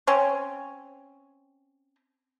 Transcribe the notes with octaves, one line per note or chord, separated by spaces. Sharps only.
C4 C#4